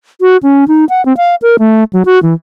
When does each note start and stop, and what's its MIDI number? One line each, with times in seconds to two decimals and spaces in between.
0.21 0.37 66
0.43 0.65 61
0.68 0.85 63
0.89 1.04 78
1.06 1.16 60
1.17 1.35 77
1.42 1.57 70
1.59 1.84 57
1.93 2.03 54
2.06 2.21 66
2.23 2.34 52